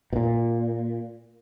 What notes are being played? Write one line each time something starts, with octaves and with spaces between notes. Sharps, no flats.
B2
A#2